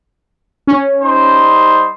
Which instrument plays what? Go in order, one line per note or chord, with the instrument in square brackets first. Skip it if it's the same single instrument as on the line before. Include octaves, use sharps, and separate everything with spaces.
[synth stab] C#4
[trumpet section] G3 D#4 C5